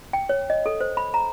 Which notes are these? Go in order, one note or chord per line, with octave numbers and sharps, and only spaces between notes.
G5
C#5
D#5
A4
C5
B5
A#5